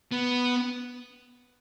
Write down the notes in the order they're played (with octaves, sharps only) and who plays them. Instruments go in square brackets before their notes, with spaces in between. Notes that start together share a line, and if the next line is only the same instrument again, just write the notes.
[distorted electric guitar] B3